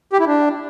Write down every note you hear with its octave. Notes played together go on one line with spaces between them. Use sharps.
G4
E4
D4